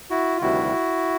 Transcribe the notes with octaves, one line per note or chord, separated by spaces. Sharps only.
E4 F#4
F4
D2 C3 D#3 G3 E4 F#4